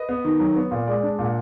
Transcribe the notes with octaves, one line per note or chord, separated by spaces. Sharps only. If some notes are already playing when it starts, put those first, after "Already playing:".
Already playing: B4 D#5
B3
D#3
F#3
B3
A#2
G#3 D5
D4
A#2
F#5